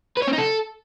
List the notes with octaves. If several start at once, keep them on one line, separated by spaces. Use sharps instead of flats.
B4
C#5
C4
D#4
A4